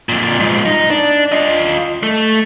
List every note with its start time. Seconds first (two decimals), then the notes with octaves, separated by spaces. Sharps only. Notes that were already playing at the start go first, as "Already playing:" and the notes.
0.09 F2 A#2
0.40 G#2 F3
0.66 D#4
0.91 D4
1.32 F4 D#5
2.03 A3